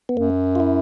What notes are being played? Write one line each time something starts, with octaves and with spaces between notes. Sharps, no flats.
B3
F#2 A#3
F4
E4